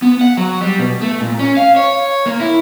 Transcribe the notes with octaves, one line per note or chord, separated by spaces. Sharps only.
B3
F#5
F#3
G3
B2
A3
A#2
C#4
F5
C#5
A#3
E4